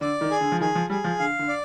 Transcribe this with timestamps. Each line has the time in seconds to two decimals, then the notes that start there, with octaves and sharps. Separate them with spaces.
0.01 D3 D5
0.21 D#3
0.31 G#4
0.41 D3
0.52 F3
0.60 D#3 G#4
0.75 F3
0.90 G3 G#4
1.04 F3
1.19 D3 F5
1.39 D3
1.48 D5